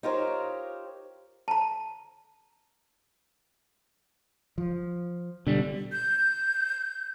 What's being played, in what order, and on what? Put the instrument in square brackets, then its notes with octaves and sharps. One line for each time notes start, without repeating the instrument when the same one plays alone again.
[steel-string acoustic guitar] D#4 F4 G4 A#4 C5 C#5
[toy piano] A5 A#5
[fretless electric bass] F3
[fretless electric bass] B2 [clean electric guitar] D3 G3
[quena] G6